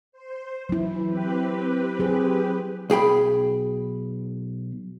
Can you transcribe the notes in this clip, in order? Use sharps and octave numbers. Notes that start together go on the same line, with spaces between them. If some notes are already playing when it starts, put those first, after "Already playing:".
C5
E3 F#3 E4
C4 G4 B4
F#3 G#4 C5
B1 G#4 G5 B5